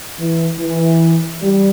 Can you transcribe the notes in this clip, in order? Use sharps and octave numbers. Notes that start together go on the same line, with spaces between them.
E3
E3
G3